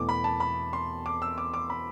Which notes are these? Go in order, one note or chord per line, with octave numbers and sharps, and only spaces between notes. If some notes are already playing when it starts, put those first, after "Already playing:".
Already playing: E2 B2 A3 D6
B5
A5
B5
C6
D6
E6
D6
D6
B5